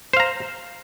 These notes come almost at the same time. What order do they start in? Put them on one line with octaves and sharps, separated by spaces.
C5 F5 A#5